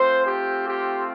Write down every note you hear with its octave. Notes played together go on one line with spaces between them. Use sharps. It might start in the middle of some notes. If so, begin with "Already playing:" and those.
Already playing: A3 C4 F4 C5
G4
G4